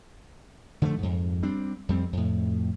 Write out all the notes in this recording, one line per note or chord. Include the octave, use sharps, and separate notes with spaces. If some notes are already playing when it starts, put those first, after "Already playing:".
D3 F3 G3 A3
F2 G#2
G3 C4 D4
F2 G3 C4
F2 A2